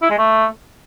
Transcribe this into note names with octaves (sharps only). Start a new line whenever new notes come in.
E4
G#3
A3